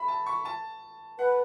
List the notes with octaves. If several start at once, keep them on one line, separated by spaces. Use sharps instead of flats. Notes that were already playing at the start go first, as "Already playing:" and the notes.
Already playing: E5 B5
A5
C#6
A5
B4 F#5